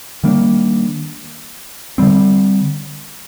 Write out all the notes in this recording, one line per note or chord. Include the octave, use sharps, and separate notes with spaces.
D#3 G3 A#3 D4
D3 G3 C4